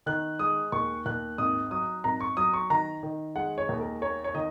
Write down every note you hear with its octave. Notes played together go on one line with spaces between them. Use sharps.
D#3 F#6
G#3 D#6
D#2 C#6
D#2 F#6
G#1 D#6
F#3 D#6
G#1 A#5
C#6
F#3 D#6
C#6
D#3 A#5
D#3
G#3 F#5
C#5
D#2
A#4
A#3 C#5
C#5
D#3 D#5